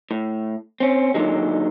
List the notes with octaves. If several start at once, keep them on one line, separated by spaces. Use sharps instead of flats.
A2
C4 C#4
A#2 D3 D#3 F#3 G#3